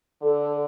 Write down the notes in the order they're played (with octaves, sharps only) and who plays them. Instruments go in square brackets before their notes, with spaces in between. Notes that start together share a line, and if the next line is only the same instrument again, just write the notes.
[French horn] D3 [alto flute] A4